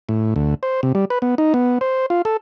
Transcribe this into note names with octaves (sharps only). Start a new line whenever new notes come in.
A2
D2
C5
C3
G3
B4
B3
D#4
B3
C5
F4
A4